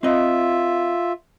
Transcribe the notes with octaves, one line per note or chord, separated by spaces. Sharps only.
C4 F4 D#5 E5